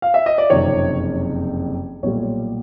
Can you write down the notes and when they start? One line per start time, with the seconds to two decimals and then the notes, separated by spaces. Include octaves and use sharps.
0.02 F5
0.14 E5
0.26 D#5
0.38 D5
0.50 F#1 F2 C3 D#3 C#5
2.03 B1 A#2 G3 C#5